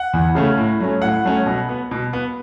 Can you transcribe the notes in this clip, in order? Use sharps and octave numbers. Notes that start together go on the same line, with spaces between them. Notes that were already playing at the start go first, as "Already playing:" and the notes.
Already playing: F#5
E2
C#3 A3 C#4
A2
F#3 A3 C#4
A2 F#5
F#3 A3 C#4
B2
B3
B2
B3